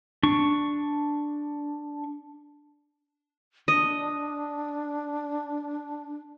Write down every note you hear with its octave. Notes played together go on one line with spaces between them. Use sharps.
D4 C#6
D4 D#5